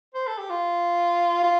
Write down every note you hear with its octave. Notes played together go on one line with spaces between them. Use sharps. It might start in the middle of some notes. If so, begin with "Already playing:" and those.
C5
A4
G4
F4
F4